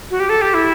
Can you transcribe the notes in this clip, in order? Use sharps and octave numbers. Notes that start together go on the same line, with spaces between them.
F#4
G4
A4
G4
E4